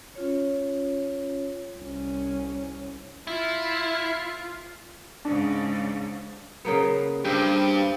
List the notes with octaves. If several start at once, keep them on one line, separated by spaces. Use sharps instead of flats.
C#4 F4 C#5
C2 C#4
E4 F4
G#2 C#3 D4
C#3 A#3 B3
G2 C4 G4